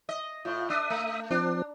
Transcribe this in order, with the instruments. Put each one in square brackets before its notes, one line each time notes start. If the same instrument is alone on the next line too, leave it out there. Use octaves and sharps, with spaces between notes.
[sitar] D#5
[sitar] A2 [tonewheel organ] F4
[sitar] D4 [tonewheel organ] E5 D#6
[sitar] A3
[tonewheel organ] F3 C4 [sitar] D4